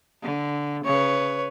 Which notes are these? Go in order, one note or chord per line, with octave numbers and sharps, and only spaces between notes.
D3
C#3 B4 C#5